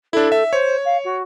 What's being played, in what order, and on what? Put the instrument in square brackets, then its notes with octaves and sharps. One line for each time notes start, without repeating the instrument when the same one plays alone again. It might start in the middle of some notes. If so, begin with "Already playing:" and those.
[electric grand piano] D4 E4 [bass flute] A4
[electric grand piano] E5
[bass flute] C5 [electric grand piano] C#5
[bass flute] F5
F#4